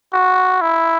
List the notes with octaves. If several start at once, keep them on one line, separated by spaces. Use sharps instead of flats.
F#4
E4